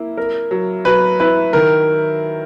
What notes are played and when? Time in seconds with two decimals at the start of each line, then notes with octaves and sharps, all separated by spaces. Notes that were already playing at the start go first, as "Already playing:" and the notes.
Already playing: A#3 E4
0.17 A#4
0.51 F#3
0.85 F#3 B4
1.20 E4 B4
1.53 D#3 A#4